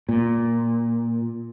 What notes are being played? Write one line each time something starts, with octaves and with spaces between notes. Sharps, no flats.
A#2